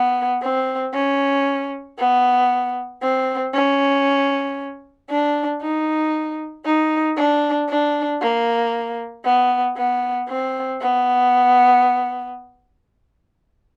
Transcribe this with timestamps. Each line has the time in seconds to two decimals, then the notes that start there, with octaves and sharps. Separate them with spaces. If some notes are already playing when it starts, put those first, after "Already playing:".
Already playing: B3
0.42 C4
0.93 C#4
1.98 B3
3.02 C4
3.54 C#4
5.10 D4
5.62 D#4
6.65 D#4
7.17 D4
7.69 D4
8.21 A#3
9.25 B3
9.77 B3
10.28 C4
10.81 B3